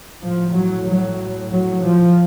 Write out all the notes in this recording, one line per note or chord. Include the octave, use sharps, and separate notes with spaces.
A2 F3
F#3
F#3
F#3
F3